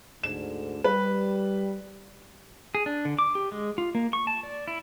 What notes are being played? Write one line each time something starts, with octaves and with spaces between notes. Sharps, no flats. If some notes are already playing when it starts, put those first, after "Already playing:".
D2 G#2 D3 E7
G3 B4
G#4
D4
D3
D6
G4
G#3
F4
A#3
C#6
A5
D5
E4